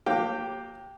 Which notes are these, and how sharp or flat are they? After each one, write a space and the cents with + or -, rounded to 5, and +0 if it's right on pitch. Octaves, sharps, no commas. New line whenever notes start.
F#3 -45 A#3 +0 G4 +0